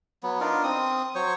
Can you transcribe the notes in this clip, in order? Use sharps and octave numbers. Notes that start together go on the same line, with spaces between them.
F#3 B3
D4 D#4 F4 A#4
C4 D#6
F#3 C5 C#5